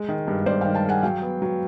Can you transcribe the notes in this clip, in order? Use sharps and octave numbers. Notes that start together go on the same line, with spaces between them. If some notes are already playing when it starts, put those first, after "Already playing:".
Already playing: G#3
D#3
G2
G2 C5 D5
D#3 F5 G5
G5 A5
G#3 F#5 G#5
F#3 F5 G5
B3
F#3